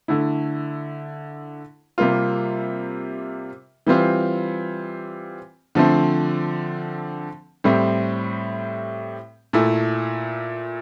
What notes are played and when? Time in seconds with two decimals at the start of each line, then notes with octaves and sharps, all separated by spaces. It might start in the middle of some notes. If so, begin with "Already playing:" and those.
0.08 D3 A3 E4
1.98 C3 G3 A#3 F4
3.87 E3 G3 C4 F4
5.75 D3 F3 A3 C4
7.64 A2 G3 C4
9.53 A#2 A3 E4